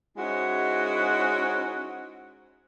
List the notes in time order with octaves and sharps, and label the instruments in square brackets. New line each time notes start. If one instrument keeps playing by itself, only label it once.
[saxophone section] G#3 C#4 D#4 E4 F#4 C5